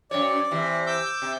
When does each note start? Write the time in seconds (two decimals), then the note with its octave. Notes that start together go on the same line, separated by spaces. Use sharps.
0.11 F#2 C#5 D5
0.51 C3 E3
0.87 D6 E6 G6
1.22 C3